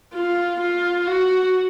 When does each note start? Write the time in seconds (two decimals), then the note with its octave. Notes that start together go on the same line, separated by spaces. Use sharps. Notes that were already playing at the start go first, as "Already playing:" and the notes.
0.14 F4
0.61 F4
1.07 F#4